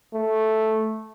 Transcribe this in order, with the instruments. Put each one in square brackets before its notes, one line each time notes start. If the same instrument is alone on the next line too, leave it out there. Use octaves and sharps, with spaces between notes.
[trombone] A3